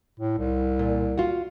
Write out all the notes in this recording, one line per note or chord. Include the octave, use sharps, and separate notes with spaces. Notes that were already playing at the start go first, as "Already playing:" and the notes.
A2
C2
A#2
F4 F#4